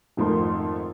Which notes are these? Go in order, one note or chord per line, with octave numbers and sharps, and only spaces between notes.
G#1 F2 A3 F4 A#4 C6